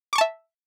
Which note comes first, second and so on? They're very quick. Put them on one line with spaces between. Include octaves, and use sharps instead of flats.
D6 C#6 A5 E5